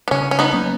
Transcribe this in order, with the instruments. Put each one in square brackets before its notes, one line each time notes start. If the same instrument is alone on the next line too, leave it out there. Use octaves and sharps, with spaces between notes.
[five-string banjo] B3
[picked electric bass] C#3 [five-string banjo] C#4
[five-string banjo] C#4
B3 D#4
[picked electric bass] F#3 A#3 C#4